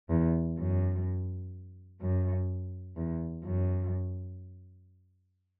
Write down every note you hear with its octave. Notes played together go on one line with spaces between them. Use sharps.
E2
F#2
F#2
E2
F#2